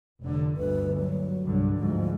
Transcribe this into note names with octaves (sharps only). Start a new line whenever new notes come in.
F1 D3
G1 D2 B4
F#3
C2 G2 D3
D2 G#2 F3